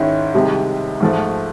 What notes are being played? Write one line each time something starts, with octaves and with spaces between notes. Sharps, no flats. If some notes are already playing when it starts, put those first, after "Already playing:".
Already playing: G#2 D#3 G#3 C#4 E4
C2 C3 D#3 G#3
G#2 F3 A3